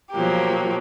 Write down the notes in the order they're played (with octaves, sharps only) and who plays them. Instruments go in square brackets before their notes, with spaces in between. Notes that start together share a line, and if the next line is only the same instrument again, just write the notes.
[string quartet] B2 F3 F#3 A#3 G4